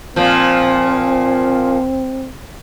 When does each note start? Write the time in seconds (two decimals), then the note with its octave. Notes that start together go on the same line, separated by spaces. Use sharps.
0.16 A#2 F3 C4